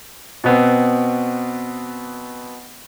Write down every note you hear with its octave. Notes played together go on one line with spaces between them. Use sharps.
B2 B3 C4